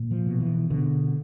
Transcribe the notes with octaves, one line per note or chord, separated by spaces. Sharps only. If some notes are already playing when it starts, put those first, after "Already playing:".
Already playing: A#2
F3
B2
E3
B2 D3